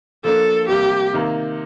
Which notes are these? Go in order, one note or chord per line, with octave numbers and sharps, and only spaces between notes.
F3 A#3 D4 A4
C3 G3 A#3 G4
C3 D#3 A#3